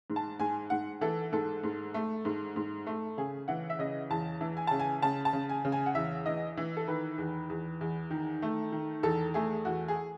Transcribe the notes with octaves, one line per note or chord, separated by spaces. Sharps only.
G#2
A5
G#2 G#5
G#2 F#5
E3 A4
G#2 A4
G#2
A3
G#2
G#2
A3
C#3 G#4
E3 F#5
E5
C#3 D#5
E2 A5
E3
G#5
C#3 A5
G#5
C#3 A5
A5
C#3
G#5
C#3
G#5
F#5
E2 E5
E3 D#5
E3
A4
D#3 B4
E2
E2
E2
D#3
A3
D#3
E2 A4
A3 G#4
E2 F#4
G#4